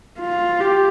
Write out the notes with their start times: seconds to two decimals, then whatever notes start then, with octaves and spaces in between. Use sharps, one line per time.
0.20 F4
0.60 G4